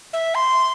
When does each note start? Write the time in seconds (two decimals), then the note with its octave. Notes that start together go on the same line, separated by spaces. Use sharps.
0.13 E5
0.35 C6